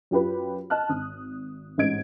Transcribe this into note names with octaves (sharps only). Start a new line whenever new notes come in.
F#2 F4 G4 B4 B5
D#5 A5 F6 F#6
G#1 D#6
A1 G#2 D#5 G#6 D7